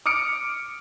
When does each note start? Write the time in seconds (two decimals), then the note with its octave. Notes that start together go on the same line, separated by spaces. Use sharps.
0.06 D6 D#6 F6 C#7 D7